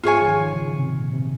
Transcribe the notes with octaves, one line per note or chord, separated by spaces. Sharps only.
G#2 F4 G#4 C#5 G#5
F3
D#3
C#3
C3
A#2
C3